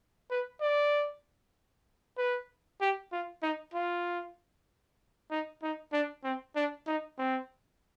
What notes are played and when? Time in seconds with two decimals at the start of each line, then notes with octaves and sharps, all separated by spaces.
0.31 B4
0.61 D5
2.17 B4
2.81 G4
3.12 F4
3.43 D#4
3.74 F4
5.31 D#4
5.63 D#4
5.93 D4
6.24 C4
6.56 D4
6.87 D#4
7.18 C4